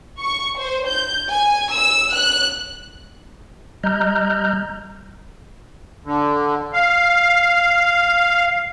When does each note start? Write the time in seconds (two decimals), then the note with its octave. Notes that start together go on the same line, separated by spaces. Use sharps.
0.21 C#6
0.58 C5
0.88 G6
1.32 G#5
1.74 E6
2.16 F#6
3.84 G3 D#5 A#5 F6 G6
6.05 D3
6.73 F5